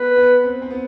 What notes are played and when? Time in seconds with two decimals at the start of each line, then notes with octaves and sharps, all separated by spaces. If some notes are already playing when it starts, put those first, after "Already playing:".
Already playing: B3 B4
0.16 B3
0.44 C4
0.62 C4
0.70 B3